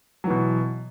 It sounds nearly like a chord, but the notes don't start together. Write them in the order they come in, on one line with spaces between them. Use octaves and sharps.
F#3 E3 B2